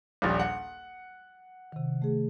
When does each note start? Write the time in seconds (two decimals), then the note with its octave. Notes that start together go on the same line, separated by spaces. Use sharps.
0.22 D#1 A#1 G3 D#6 F6 A6
0.39 F#5
1.72 C3 D#3
2.02 A3 G#4